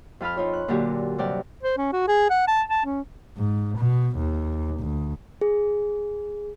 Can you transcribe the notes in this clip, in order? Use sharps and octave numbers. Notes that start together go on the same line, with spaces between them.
F2 F4 B5 F6
D#4 F4 C#5
F#6
A#2 D3 F#3 D4 F#4 G4
G2 C3 F#3 D5 F#5 G5
C5
C#4
F#4
G#4
F#5
A5
A5
C#4
G#2
B2
D#2
D2
G#4